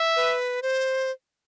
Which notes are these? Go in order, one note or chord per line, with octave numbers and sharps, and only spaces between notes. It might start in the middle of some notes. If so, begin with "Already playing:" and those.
Already playing: E5
B4
C5